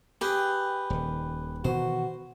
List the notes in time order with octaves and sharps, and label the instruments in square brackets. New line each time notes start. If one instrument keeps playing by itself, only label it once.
[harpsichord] G4 G#4 [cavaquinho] B4 G5
[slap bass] D#1 D#3
[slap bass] B2 D#3 E3 [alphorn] F#4 [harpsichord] C5